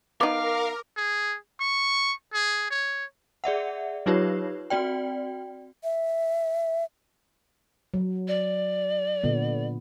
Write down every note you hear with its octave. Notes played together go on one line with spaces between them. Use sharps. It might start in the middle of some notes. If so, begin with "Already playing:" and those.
B3 D#4 A#4 F5 D6
G#4
C#6
G#4
C#5
G#4 D5 E5 F#5
F#3 D#4 F4 G4 B4 C#5
C4 F#4 D5 G5
E5
F#3
D5
A#2 D3 B3